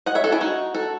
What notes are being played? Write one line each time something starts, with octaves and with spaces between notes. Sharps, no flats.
D#5 F#5
C#5 E5
F#4 A4
E4 G#4
D#4 F#4
F#4 A4